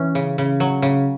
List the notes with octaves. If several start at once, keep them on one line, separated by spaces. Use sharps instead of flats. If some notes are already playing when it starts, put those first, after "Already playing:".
Already playing: E3 C#4
C#3
C#3
F#3
C#3